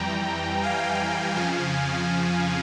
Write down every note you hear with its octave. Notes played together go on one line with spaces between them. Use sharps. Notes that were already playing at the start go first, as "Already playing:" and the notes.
Already playing: F2 E3 G3 G5 A#5
F5 G#5
F2 C#3 F3